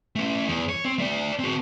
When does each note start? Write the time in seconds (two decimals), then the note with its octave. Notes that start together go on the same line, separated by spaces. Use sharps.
0.16 A3 C#4
0.48 E2
0.69 C#5
0.85 C4
0.99 A3 D5
1.39 C4 F#4